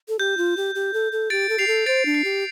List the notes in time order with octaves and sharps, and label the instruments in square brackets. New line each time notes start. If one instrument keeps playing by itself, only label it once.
[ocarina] A4
[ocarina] G4 [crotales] G6
[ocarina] F4
G4
G4
A4
A4
[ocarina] G4 [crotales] A6 D7
[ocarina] A4
[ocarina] G4 [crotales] C7 F7
[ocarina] A4
[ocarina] C5 [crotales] A6 D7
[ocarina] D4
[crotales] C7
[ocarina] G4